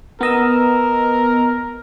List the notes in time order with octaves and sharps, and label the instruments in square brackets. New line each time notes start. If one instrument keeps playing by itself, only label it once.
[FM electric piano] B3 D#5 E6 [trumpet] A#4